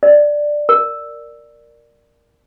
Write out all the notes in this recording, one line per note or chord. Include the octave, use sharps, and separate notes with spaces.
D5
A#4